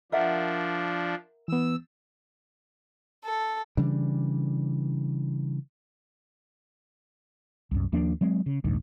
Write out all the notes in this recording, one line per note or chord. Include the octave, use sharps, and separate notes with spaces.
F3 D4 A#4 E5 F#5
E3 B3 E6
A4
C#3 E3 G3 D4
C2 F#2
D#2 F3 A#3 D4
F#3 G#3 C4
C#3
D#1 A#1 D#2 G#2